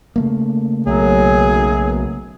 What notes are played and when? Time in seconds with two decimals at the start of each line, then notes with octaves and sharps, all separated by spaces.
0.16 C#3 A3 A#3
0.86 B1 F#2 F#3 G#4